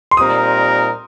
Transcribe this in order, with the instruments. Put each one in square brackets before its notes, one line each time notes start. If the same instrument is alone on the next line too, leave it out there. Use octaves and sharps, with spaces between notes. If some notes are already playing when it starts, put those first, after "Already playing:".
[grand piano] C6
[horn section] A#2 G3 C4 D#4 A#4 [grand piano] D#6